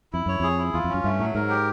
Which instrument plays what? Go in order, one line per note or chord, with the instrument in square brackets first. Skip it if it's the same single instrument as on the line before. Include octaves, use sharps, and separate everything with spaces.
[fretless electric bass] F2 [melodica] E4
[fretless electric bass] F#2 [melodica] C#5
[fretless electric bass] F2 [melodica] G#4
[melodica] E4
[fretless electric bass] E2 [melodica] F4
[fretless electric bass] F2
[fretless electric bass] F#2 [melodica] C#4
[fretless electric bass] G2 [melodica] A3
[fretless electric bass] A2 [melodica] F#3
[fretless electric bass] G#2 [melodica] A#4
[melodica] G4